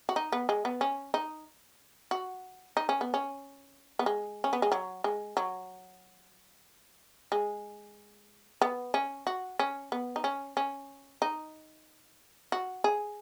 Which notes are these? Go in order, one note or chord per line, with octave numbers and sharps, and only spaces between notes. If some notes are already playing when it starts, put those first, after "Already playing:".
F#4
D#4
B3
G#3
B3
C#4
D#4
F#4
D#4
C#4
B3
C#4
B3
G#3
C#4
B3
G#3
F#3
G#3
F#3
G#3
B3
C#4
F#4
C#4
B3
D#4
C#4
C#4
D#4
F#4
G#4